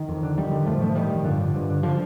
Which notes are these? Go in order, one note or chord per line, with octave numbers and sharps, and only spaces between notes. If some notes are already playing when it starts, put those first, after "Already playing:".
Already playing: D#3
F2
D3
F2 D#3 G3
D3
A2 F3 A3
A2 F3 A3
A2 D#3 G3
A2
G2 D3 F3
D3
G2
D3
D3 F3